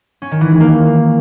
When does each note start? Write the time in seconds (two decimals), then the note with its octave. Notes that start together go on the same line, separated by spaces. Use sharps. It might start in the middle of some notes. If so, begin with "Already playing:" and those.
0.22 C#4
0.31 D#3
0.41 E3
0.51 G#3
0.60 A#3